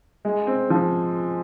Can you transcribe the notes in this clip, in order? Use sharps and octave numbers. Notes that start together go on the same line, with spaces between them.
G#3
C4
F3